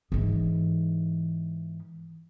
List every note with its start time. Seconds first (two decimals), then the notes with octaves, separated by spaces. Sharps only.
0.12 G#2 E3